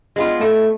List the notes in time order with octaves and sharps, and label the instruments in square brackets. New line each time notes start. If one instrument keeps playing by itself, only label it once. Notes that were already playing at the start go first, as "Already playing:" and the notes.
[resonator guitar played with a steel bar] G#3 B3 F4
[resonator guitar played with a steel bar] A2 [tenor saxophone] A3